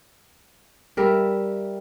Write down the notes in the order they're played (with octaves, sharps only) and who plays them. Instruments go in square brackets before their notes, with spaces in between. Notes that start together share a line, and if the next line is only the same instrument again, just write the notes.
[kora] G3 A#4 E5